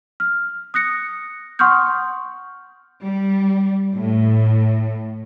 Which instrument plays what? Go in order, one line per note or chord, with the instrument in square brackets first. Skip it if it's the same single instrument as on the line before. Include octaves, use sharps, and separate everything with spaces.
[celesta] F6
D#6 F#6 A#6 C#7
F#5 C6 C#6 D#6 F6 G6
[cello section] G3
A2